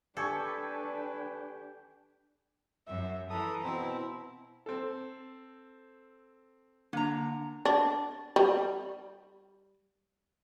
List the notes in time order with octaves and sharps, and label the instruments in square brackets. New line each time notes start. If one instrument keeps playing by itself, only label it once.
[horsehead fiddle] D4 G5 [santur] G4 G#5 C#6 [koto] A4 [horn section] B4
[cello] F#2 [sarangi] E5
[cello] E3 [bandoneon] A4 D#6 [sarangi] A#5
[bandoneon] B2 C4 [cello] E4
[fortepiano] C4 A4
[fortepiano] D3 [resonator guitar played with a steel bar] A#3 A#5
[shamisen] D4
G3